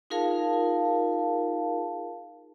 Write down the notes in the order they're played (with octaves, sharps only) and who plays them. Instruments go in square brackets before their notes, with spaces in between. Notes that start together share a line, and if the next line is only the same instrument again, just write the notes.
[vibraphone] D#4 F4 G#4 A#4 F5 A5